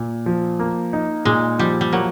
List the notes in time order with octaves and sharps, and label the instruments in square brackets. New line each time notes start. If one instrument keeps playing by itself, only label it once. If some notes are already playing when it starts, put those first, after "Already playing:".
Already playing: [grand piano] A#2
F3
A#3
D#4
[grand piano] A#2 [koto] G#3
[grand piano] F3 [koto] G3
[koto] G3
[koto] F#3 [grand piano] A#3